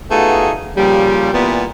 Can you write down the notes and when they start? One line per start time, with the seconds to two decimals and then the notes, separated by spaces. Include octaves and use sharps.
0.10 A3 B3 D#4 F4 F#4 G#4
0.76 A#2 C#3 F3 G3
1.33 A#2 E3 G3 B3